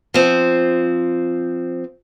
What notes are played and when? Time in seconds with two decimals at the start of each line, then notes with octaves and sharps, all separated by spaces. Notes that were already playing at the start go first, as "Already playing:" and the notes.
0.14 F3 C4